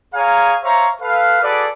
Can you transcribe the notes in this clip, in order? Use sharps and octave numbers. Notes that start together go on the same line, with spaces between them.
G#4 C#5 F5 G#5 A#5
C5 C#5 E5 F5 A#5 C#6
A4 B4 F5
F#4 G#4 A4 B4 D5